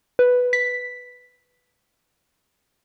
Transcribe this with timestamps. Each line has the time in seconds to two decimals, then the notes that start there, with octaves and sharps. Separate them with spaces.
0.19 B4
0.53 B6